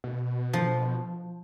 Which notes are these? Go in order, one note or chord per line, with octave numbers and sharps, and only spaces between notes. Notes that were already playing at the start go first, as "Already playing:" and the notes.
B2
F3